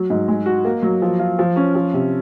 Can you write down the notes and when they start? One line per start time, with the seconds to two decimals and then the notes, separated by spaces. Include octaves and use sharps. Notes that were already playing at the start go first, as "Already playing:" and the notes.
Already playing: F#3
0.10 G#2
0.28 G#3
0.46 F#4
0.65 A#3
0.82 F#3
1.02 F3
1.19 F4
1.39 F3
1.56 C#4
1.75 F3
1.93 C3